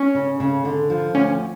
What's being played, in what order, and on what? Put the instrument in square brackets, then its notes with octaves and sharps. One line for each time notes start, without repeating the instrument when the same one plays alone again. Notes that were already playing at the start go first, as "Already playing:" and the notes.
Already playing: [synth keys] C#4
[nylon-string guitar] C#3
C#3
D3
F3
[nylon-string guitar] D2 [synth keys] C#4